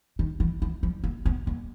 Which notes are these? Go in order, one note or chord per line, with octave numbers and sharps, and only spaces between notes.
D#3
E3
E3
F3
A#3
B3
A#3